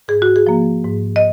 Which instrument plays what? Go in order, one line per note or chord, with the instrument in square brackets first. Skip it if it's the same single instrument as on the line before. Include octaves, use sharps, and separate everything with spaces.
[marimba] G#2 G#4
F#4
G#4
F3 A#3
G#2
D#5